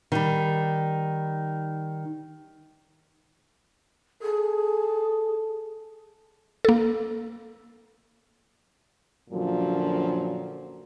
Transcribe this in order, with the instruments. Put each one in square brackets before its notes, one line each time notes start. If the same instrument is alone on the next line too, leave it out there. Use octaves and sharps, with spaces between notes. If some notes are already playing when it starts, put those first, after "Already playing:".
[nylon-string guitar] D#3 G3
[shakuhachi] G#4 [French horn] A4
[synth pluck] A#3 A4
[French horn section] F#2 A#2 D3 F3 F#3